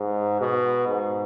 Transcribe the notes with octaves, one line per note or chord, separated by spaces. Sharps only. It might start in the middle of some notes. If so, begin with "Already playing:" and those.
Already playing: G#2
B2
G#2